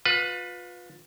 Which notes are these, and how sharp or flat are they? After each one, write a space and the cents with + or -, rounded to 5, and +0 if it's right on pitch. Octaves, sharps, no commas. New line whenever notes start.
F4 +30 B4 +0